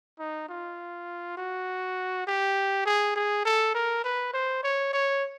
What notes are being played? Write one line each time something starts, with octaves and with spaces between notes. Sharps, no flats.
D#4
F4
F#4
G4
G#4
G#4
A4
A#4
B4
C5
C#5
C#5